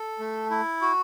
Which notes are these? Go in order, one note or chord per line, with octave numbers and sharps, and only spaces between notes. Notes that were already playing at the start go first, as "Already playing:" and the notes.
Already playing: A4
A3
E4
F#4